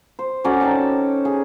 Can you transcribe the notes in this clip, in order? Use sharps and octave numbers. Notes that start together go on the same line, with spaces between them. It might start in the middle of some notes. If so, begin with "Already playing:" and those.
C5
F#3 C#4 A4 D5
D#4 G5 A5
G#4